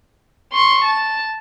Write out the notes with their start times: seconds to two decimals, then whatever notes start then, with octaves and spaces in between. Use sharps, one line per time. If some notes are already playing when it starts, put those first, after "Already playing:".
0.52 C6 C#6
0.84 A5